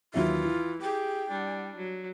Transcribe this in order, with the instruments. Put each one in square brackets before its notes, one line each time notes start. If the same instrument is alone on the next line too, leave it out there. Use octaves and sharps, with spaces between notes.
[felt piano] D#2 F#3 E5 [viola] E3 [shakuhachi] F4
[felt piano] E4
[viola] G4 G#4 [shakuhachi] G5
[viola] G3 D4
F#3